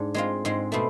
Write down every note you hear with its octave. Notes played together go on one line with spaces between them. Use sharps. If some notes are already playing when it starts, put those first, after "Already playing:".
Already playing: G#2 D4
G#3 C4 F4
G#2 G#3 C4
B2 A3 C4